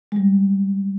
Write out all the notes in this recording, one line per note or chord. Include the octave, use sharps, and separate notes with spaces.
G3 G#3